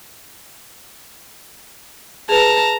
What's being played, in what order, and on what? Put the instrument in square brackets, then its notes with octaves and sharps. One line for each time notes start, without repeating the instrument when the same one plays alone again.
[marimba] G#4 B4 [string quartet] A5 A#5 F6